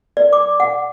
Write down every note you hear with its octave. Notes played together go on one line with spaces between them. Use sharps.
D5
D6
F#5